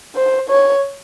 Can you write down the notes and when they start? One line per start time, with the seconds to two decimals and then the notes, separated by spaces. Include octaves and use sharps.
0.16 C5
0.49 C#5